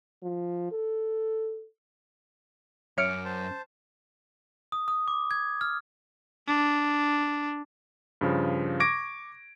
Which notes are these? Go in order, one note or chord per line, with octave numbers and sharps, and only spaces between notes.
F3
A4
F#2 C#5 E5 D6 F6 C#7 D7
C5 A5
D#6
D#6
D6
G#6
F6
D4
G2 C#3 F3
C#6 D6 G#6 A#6 D7